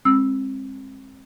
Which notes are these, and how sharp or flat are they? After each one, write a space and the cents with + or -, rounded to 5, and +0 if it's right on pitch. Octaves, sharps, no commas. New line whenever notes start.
G#3 -15 C4 +25 E6 +0